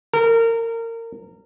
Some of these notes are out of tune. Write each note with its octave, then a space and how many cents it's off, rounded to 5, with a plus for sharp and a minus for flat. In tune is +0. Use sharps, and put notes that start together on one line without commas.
A#4 -25